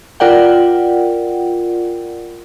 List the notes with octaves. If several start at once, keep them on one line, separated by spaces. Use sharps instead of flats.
F4 A#4 D5 F#5 G5